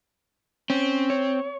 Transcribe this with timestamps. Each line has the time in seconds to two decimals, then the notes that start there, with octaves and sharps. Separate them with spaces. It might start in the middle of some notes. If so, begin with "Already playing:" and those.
0.70 C4 C#4
1.10 C#5